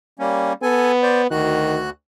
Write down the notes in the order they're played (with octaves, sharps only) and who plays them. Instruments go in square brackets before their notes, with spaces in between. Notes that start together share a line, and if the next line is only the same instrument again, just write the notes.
[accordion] G3 A#3 C#4
[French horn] B3 [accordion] A4 G#5
[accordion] C5 D5
[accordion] D2 F#4 F#6 [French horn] D#3